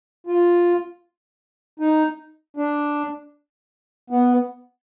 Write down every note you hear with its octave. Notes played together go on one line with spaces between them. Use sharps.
F4
D#4
D4
B3